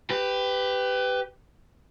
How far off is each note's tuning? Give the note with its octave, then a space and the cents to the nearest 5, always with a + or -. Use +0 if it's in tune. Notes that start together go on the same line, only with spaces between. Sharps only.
G4 +0 B4 +20